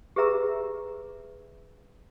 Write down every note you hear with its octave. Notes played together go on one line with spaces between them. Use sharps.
G4 G#4 B4 E5 A#5 E6